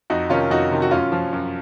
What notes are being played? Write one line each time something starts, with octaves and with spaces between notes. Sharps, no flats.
F2 D#4 F#4
C3 D#3 C#4 F4
F2 D#4 F#4
C3 D#3
F#4
F#2 C#4 F4
F3
F#2